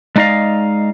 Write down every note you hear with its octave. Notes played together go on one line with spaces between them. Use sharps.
G#3 A3 D#4 D5 D#5 F5